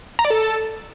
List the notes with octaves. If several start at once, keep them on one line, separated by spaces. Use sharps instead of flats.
A#5
D5
A4